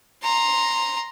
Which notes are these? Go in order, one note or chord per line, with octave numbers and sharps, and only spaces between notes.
A#5 C6